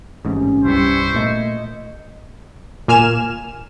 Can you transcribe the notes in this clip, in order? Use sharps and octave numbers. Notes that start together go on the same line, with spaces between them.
A1 G#2 C3 C#4
C2 G2 G3 E4 C5 C#6
A#2 A3 D#5
A#2 A#3 G#5 F6 E7